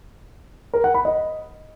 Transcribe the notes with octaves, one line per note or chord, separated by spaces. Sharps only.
A#4
F#5
B5
D#5